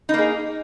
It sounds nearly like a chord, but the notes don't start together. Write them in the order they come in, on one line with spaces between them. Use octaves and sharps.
D#4 A#3 G#4